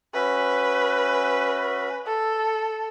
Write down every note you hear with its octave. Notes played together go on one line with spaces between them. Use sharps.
C#4 F#4 B4 E5
A4